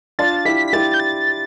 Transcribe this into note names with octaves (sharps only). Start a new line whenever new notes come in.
D4 F4 A6
E4 G4 B6
B6
E4 G4 A6
G6
A6